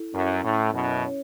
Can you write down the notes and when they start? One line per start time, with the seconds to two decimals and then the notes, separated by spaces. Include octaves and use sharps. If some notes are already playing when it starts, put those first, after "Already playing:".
Already playing: E4 A4
0.13 F#2 C#4
0.44 A2
0.57 C#4
0.73 F#2 B2
1.02 C#5